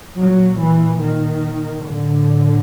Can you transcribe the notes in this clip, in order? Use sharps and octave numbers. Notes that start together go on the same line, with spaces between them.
A#2 F#3
E3
D#3
A2 D3